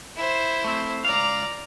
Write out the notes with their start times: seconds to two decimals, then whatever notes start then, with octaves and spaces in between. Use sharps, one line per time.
0.16 E4 C5
0.64 A3 C4
1.05 C#2 D5 F5 A#5